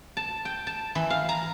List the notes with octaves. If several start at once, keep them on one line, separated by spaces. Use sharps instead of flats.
A5
G5
A5
E3
F5
A#5